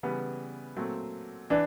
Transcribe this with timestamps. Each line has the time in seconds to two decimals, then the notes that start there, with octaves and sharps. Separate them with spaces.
0.03 C#3 E3 G3 B3
0.77 A#2 F#3 A3 C4
1.50 E3 D4